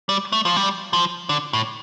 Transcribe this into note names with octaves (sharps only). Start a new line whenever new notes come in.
G3
A3
F3
G3
F3
D3
A2